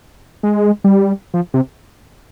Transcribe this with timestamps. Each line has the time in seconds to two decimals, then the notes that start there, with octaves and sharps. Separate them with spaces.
0.43 G#3
0.84 G3
1.34 F3
1.54 C3